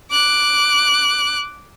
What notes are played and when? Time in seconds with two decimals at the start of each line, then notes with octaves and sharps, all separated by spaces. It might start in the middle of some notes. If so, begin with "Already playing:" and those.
0.11 D6 F#6